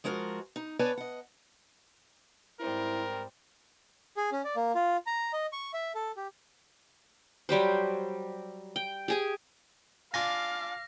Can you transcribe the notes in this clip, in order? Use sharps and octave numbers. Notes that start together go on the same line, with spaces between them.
F3 G#3 F4 F#4 A#4
D#4
B3 B4 C#5 D5 G#5 A5
D#5 F#5
G#2 G3 C4 E4 A#4
G#4
C#4
D5
A#3
F4
A#5
D#5
C#6
E5
A4
G4
F#3 G3 G4 C5
G5
G4 G#4 G#5
D4 F4 F5 G#5 D6 A#6